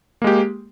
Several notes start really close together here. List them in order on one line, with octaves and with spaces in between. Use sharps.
A#3 G#3 G4